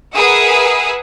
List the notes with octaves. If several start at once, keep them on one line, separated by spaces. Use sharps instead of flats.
G#4 A#4 B4 E5 F#5 G#5